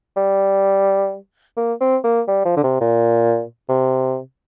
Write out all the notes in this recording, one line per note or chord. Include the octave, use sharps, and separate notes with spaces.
G3
A#3
C4
A#3
G3
F3
D3
C3
A#2
C3